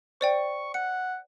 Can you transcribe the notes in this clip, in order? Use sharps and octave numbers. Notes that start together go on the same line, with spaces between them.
C5 D5 G5 C#6
F#5 C#7